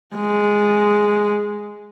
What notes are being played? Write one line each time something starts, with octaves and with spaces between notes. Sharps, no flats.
G#3